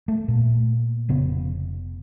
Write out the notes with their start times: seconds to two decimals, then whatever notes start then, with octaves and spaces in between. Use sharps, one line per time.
0.08 A3
0.28 A#2
1.09 F1 C#3 B3